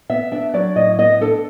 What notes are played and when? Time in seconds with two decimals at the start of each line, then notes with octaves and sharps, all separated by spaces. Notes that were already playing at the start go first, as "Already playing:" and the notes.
0.10 B3 E5
0.31 D4 E5
0.53 F#3 D5
0.76 A2 D#5
0.98 B3 D#5
1.21 D4 A4